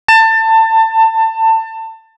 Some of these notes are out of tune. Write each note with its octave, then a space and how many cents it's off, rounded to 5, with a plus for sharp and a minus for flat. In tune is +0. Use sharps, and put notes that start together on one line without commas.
A5 +25